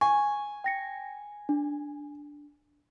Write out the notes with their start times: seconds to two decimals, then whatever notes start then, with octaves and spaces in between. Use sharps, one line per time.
0.01 G#5 C#6
0.64 G5 A#6 C#7
1.49 D4